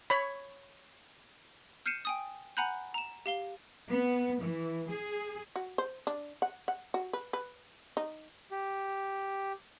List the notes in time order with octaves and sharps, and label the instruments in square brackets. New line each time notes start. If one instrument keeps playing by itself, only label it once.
[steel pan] C#5 B5
[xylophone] F6 G6 C7 C#7 D#7 E7
G5 G#5 D#6
F#5 G#5 A#5 B5 F#6 G6
A#5 E7
G4 F5 G7
[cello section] B3
E3
G#4
[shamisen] F#4
C5
D4
F#5
F#5
F#4
B4
B4
D#4
[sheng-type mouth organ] G4